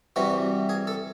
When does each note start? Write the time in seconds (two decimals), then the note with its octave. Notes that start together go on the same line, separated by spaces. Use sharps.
0.16 C3 E3 G3 F#4
0.69 G#4
0.87 A4